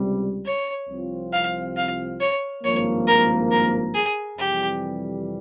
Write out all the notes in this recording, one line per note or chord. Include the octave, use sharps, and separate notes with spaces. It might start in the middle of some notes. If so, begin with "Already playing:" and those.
Already playing: C#2 C3 G3
C#5
C2 C3 F3 C4 F4
F5
F5
C#5
G#1 G2 F3 A#3 C#5
A#4
A#4
G#4
F2 C3 E3 G3 G4